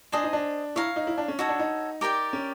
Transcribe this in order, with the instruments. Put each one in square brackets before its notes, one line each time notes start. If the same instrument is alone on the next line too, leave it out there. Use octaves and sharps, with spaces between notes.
[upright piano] D4 [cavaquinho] C5 D#5 G#5
[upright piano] D#4
D4
[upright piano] E4 [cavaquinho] C#5 F5 A#5
[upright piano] D#4
E4
D4
C#4
[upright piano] D#4 [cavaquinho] F#4 A4 C#5
[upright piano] D4
D#4
[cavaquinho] G4 A#4 D5 G5
[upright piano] C#4